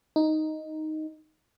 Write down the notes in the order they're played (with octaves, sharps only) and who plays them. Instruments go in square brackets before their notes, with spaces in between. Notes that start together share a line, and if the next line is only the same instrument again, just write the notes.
[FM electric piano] D#4